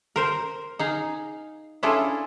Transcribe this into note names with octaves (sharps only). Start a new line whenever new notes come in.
A#4 C5
D#4 G#4 F5
C#4 D4 E4 F4 G#4 A4